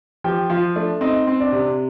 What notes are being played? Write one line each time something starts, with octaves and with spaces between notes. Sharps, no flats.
F3 G4 G5
F3 F4 F5
A3 D4 D5
C4 D#4 D#5
C4
D4 D5
C3